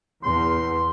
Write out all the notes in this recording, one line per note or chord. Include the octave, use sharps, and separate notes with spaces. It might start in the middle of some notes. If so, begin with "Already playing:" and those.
E2 C6